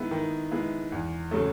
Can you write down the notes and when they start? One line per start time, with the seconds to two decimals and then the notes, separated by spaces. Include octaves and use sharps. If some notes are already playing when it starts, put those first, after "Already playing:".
Already playing: D#3 G#3 B3 E4
0.11 D#3
0.52 G#3 B3 E4
0.92 E2
1.31 C#3 F#3 A3